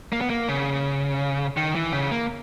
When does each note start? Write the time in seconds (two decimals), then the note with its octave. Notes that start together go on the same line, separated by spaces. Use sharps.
0.13 A#3
0.21 B3
0.30 A#3
0.49 C#3
1.57 D#3
1.75 E3
1.93 C#3
2.11 A#3